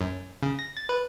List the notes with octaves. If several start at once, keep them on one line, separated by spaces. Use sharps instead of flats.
F#2
C#3
A#6
A6
B4